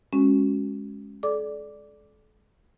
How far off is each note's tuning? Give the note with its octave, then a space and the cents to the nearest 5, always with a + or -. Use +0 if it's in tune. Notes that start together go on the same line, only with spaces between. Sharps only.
G#3 +0 C#4 -10 F#4 +0
A4 -35 D5 +0 D6 -10